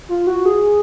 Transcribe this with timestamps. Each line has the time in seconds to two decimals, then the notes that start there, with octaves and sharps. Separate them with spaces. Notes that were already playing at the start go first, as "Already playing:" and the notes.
0.09 F4
0.27 F#4
0.46 G#4